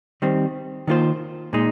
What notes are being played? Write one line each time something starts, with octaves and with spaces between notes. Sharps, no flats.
D#3 G3 C4
D#3 A#3 F4 C5
A#2 G#3 D#4